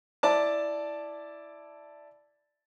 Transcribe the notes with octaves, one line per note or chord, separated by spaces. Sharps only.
E4 D5 A5